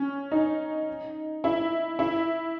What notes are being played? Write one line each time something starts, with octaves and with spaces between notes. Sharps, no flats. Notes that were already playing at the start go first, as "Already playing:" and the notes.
Already playing: C#4
D#4
E4
E4